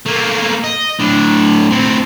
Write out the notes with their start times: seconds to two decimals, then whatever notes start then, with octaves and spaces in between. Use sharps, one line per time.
0.06 A3 A#3
0.64 D#5
1.00 A2 D4
1.71 A2 C4